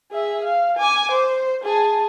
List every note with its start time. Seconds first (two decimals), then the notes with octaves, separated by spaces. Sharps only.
0.11 G#4 E5
0.44 F5
0.77 G#5 D6
1.11 C5
1.63 G#4 A5